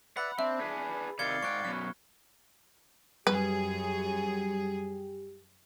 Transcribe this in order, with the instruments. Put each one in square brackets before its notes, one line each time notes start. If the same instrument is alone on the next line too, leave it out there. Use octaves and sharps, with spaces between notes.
[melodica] B4 D5 E5 [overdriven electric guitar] F#5 [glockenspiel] B5
[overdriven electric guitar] C4 [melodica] D4 [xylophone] E5
[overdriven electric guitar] G#4 B4
[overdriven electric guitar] C3 D#3 [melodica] D5 F5 [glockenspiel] G#6 C#7 G7
[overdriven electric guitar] G#2 G5 [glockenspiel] C#6 F#6
[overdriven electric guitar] F#2 B2 [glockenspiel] F6
[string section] F#2 G#4 [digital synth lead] G3 [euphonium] G4 [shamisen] B4